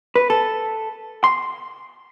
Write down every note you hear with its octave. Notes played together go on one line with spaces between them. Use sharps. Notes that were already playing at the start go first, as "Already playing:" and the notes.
B4
A4
C6